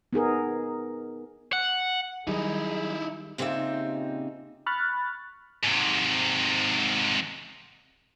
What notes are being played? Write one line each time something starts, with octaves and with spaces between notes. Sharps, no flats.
B3 D#4 G#4 A#4
F#5
D#3 F#3 G3 D#4 E4 G#4
A#2 C#3 C4 D#4 G4 E5
B5 C#6 F6 F#6 A6
G#2 C3